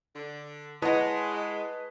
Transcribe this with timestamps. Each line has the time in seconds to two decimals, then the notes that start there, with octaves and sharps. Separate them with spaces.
0.16 D3
0.82 G#3 E4 B4 C#5 D#5 F#5 A5 D#6